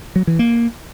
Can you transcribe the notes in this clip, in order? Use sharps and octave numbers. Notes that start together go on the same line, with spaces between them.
F#3
E3
A#3